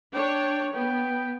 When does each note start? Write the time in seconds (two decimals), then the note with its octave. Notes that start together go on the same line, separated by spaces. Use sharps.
0.14 D4 C#5 G5
0.75 B3 G5